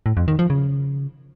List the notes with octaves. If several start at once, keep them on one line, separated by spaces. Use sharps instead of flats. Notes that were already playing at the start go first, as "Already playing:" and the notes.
A2
F2
D#3
F3
C#3